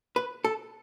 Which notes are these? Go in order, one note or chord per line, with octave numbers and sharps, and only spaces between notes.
B4
A4